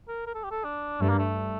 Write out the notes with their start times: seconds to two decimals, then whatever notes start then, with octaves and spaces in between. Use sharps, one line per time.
0.08 A#4
0.26 A#4
0.35 A4
0.44 G4
0.51 A4
0.64 D4
1.01 G2 A3
1.09 A#3
1.19 A3